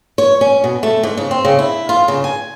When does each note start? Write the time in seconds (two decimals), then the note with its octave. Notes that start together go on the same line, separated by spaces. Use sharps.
0.18 C#5
0.41 C#4
0.64 B2
0.83 A3
1.03 G#2
1.17 C#3
1.31 C4
1.45 C#3
1.59 E4
1.89 F4
2.08 C#3
2.24 G#5